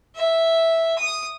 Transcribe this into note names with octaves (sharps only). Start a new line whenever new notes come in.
E5
D#6